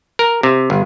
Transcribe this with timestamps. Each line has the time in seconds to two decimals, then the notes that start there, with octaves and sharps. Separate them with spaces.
0.19 A#4
0.43 C3
0.70 G1